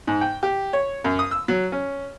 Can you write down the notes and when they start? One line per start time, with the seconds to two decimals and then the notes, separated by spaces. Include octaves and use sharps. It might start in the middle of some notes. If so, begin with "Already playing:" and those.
0.07 G#2
0.21 G5
0.43 G4
0.73 C#5
1.04 F#2
1.19 D#6
1.31 E6
1.48 F#3
1.72 C#4